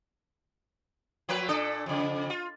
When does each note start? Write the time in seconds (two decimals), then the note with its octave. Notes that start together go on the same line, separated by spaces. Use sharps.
1.29 F3 A#3 B4
1.49 A#2 D4 A4
1.86 F2 C#3
2.30 F4